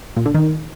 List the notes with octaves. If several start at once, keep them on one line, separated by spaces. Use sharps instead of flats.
A#2
D3
D#3